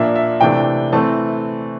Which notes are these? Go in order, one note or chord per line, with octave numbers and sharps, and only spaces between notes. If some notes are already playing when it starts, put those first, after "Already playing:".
Already playing: A#2 F3 A#3 D4 E5
E5
C3 E3 A3 D4 G5
E3 A3 C4 A5